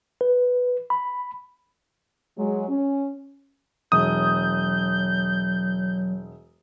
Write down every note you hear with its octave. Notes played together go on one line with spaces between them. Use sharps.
B4
B5
F#3 G#3
C#4
E1 F#3 D#6 G6